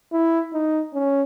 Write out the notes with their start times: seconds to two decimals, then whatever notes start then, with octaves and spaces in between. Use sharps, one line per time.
0.13 E4
0.53 D#4
0.94 C#4